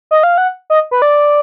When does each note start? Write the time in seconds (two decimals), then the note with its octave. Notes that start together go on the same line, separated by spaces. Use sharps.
0.11 D#5
0.23 F5
0.38 F#5
0.70 D#5
0.91 B4
1.02 D5